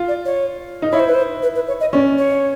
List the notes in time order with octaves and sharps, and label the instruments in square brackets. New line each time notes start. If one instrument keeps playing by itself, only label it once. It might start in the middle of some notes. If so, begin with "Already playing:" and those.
Already playing: [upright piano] F4
[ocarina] D5
C#5
[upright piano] D#4
[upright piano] E4 [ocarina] C#5
[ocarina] C5
B4
C5
B4
B4
C#5
D#5
[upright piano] C#4 [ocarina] D5
[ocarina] C#5